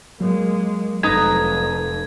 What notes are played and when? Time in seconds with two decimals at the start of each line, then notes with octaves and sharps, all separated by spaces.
0.21 F#3 G#3 A#3
1.03 F1 F2 D#4 B4 A#5 G#6